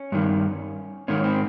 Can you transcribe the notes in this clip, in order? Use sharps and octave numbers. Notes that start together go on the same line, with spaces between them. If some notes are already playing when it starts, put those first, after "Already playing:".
Already playing: C#4
G2 D#3
G#2 D#3 C#4
C4